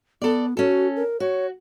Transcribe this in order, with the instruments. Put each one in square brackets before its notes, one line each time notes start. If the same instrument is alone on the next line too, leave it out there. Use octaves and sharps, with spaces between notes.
[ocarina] B3 [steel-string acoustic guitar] A4 D5
[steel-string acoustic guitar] C#4 A4 [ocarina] F#4
[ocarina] A#4
[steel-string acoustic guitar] F#4 [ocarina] C#5